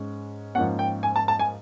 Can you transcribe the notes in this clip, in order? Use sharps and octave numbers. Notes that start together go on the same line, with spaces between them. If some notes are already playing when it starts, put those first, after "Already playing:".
Already playing: G#2 G#3 C#4
G#2 F3 A#3 C#4 F#5
G5
G#5
A5
A5
G#5